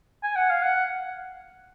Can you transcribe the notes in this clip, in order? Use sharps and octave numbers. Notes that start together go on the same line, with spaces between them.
G#5
F#5
F5
F#5